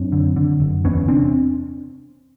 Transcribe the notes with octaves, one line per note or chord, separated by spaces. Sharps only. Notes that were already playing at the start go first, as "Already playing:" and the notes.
Already playing: F#2 C4 D4
D3
D3
F#1
E2 B3 C#4
C3 C4 D4